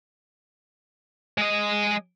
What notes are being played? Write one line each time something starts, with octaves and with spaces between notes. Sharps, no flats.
G#3 D#5